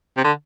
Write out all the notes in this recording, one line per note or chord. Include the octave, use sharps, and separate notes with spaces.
C3
D3